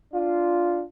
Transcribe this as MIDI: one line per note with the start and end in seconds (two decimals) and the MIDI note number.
0.13 0.83 62
0.13 0.83 65